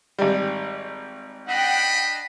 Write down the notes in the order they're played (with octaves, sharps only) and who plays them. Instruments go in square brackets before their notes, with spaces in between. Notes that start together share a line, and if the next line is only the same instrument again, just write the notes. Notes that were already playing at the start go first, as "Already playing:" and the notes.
[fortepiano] G#1 G3
[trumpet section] D4 D#5 B5 [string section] F#5 G5